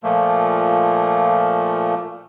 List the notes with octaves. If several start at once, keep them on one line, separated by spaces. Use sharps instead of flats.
A#2 F3 A3 A#3